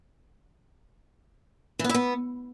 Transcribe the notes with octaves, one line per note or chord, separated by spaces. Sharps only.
E3
B3
E4
B3